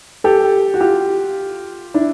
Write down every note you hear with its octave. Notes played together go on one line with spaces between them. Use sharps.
G4 A4
F#4
F4 G4
D4 E4